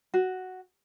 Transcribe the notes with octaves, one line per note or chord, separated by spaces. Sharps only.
F#4